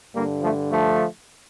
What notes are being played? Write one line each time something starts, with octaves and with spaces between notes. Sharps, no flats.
G2 D3 G3 A#3
F3 A3
F3 A3